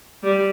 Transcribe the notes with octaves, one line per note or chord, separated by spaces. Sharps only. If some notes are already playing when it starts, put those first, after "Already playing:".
G3